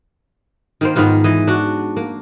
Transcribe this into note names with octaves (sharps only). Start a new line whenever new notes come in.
D#3 A#3 C5
G#2 D#3 B3 F4
E3 D#5
D4 F#4
A#3